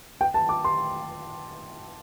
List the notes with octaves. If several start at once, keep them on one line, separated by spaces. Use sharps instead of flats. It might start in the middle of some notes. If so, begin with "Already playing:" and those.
G5
A5
D6
C6